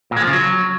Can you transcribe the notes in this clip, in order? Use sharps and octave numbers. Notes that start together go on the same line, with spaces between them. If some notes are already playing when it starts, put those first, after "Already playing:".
A#2
G#3
F3
C#3
F#3